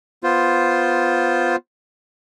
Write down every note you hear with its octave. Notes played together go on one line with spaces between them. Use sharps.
B3 F4 C5